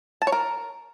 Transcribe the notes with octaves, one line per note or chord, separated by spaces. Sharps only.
A5
C#5
A#4